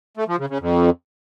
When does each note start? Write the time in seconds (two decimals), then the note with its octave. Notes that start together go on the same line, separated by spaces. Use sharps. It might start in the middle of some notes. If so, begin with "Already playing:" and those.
0.17 A3
0.28 F3
0.39 C#3
0.49 C#3
0.60 F2